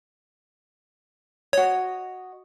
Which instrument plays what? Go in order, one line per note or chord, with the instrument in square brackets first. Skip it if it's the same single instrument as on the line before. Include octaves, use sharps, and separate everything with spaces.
[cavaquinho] F#4 D#5 [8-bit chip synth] C#5